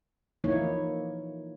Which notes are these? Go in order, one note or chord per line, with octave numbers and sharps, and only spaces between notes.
E3 F3 A#3 D#4 E4 C#5